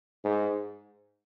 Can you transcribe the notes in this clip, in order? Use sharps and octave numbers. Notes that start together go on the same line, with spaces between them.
G#2